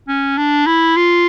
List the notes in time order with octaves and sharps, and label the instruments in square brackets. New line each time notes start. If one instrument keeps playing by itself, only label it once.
[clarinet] C#4
D4
E4
F4